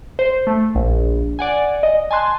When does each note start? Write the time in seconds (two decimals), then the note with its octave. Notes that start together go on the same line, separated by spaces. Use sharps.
0.19 C5
0.47 A3
0.75 A#1
1.39 D5 F#5 G#5
1.83 D#5
2.11 G#5 A5 C6 F#6